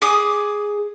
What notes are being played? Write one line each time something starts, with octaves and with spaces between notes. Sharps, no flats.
G#4 D6 D#6